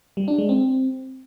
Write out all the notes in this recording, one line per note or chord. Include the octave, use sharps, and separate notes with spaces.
G3
D4
G#3
C4